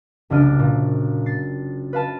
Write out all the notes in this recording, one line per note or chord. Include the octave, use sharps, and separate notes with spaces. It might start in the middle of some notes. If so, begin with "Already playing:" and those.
F#1 C2 D4 F6 D#7
A#2
A6 C7
B4 F5 A5